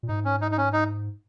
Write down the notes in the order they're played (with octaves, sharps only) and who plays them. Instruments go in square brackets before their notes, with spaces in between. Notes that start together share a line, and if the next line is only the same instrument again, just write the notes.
[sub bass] A#2
[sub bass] G#2 [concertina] D#4
[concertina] C#4
D#4
D#4
C#4
D#4